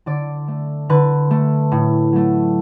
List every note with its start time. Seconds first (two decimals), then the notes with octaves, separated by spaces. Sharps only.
0.06 D3 D5
0.48 A3
0.89 D3 B4
1.31 A3
1.72 A2
2.12 F#3 A3